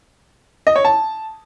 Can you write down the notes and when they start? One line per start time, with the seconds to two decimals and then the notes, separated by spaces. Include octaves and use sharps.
0.67 D#5
0.76 C#5
0.85 A5